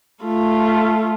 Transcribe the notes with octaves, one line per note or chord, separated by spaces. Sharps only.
A3 F4